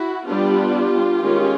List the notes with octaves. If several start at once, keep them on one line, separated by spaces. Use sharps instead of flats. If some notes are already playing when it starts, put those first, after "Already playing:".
Already playing: E4 F#4
G3 B3 D4 F4 G4
D#3 G#3 C#4